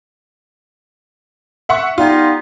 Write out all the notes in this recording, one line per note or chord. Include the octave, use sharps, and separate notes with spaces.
E5 F#5 C#6
G3 B3 D#4 F4